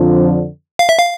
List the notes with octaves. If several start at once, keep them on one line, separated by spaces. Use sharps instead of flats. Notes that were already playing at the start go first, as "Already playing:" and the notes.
Already playing: F2 D3 F3
F5
E5
F5